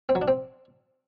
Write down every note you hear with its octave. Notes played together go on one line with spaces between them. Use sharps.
C4
F#3
D4
C4